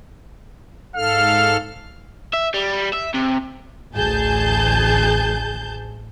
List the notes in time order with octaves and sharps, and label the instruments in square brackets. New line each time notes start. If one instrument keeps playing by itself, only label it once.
[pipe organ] G#2 A4 F6 [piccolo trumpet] F5
[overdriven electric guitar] E5
G3
E5
C3
[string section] A1 D2 G#4 A5 G6